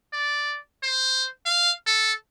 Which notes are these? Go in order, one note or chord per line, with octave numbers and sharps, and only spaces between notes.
D5
C5
F5
A4